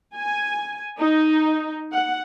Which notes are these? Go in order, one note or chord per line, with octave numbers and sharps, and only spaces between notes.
G#5
D#4
F#5